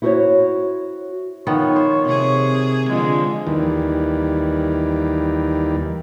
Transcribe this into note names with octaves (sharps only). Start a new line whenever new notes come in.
E4 F#4 A4 A#4 C5 C#5
D#3 F3 B3 C#5
C5
C3 G#4
D3 F3 G#3
D#2 D#3 E3 G3